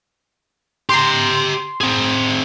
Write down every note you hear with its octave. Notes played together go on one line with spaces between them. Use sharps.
G4 A#5 C6
C4 G#4